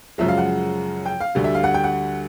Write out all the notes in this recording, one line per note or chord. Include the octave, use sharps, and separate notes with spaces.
F#2 C#3 F3 G#3 E5
F5
F#5
G5
F5
D2 D3 G3
E5
F5
F#5
G5
F#5